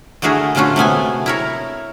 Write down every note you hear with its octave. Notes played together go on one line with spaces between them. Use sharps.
D3 A3 E4 F#4 G#4 A#4
A#2 D3 A3 C#4 F4 F#4
C3 A3 B3 G#5
E4 A#4 C#5